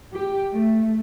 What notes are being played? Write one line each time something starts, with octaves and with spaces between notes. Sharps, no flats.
G4
A3